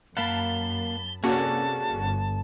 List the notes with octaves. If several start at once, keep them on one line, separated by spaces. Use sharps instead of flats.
F#2 A#3 F5 F#5 A5 B5 G7
C3 A#3 C#4 F#4 G#4 A4 D5 A5
G1